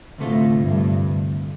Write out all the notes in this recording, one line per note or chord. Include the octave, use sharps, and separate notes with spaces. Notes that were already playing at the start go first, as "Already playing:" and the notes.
D2 A2 C3 A3 F4
G2